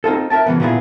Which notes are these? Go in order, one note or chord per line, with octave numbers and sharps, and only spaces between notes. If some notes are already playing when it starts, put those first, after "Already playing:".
C4 D#4 F4 A4
A#4 E5 G5 A5
C#3 E3 B3
A#2 D3 B3 E4 F4 G#4